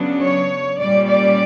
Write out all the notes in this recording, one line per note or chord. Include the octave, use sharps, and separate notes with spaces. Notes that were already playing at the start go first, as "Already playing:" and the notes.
Already playing: C#3 F#3 B3 D4
C#5
A#2 G3 C#4 D5
D5